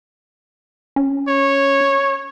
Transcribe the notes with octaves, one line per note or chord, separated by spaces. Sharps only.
C#4
C#5